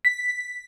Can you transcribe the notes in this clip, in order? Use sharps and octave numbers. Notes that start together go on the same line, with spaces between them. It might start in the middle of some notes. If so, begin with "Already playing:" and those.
B6